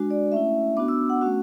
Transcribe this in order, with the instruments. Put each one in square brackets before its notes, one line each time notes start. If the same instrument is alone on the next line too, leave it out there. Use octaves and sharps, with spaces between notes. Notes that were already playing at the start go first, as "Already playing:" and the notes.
Already playing: [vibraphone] G#3 D4 F#4
D5
A3 C#4 E4 E5
B3 D4 F#4 D6
E6
F#5
A3 C#4 F#4